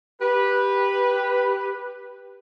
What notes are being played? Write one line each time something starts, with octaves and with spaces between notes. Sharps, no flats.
G4 B4